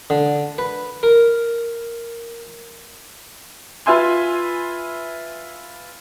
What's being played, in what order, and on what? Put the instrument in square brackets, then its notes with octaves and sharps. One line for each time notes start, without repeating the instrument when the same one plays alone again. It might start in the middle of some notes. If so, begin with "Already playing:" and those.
[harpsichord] D3
B4
A#4
[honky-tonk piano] F4 B4 E5 G#5 C6